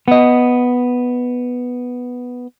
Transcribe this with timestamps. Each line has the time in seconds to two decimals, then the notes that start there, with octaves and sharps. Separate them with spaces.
0.08 B3 D#5